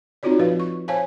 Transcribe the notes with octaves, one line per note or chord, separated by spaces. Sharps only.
C4 D#4 F4 F#4 C#5 D5
F3 B4 F5
C#6
C5 C#5 F5 G#5 A5